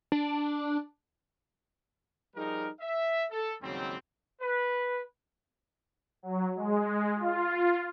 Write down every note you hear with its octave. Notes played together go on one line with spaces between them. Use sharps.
D4
F3 G3 D#4 G#4 A#4
E5
A4
D#2 G#2 C#3 F#3 G3 C4
B4
F#3
G#3
F4